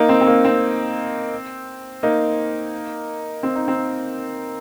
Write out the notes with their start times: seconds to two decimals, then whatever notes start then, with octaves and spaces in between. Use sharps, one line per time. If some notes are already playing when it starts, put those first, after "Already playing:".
Already playing: A#3 D#4
0.09 C4
0.21 C4
0.27 A#3
0.45 C4
2.03 A#3 D#4
3.43 C4
3.56 D#4
3.68 C4